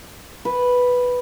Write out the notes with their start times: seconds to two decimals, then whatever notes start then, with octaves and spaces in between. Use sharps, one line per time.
0.45 B4